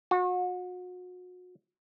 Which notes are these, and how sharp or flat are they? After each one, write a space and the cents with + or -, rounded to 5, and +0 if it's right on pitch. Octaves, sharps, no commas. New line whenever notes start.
F#4 -35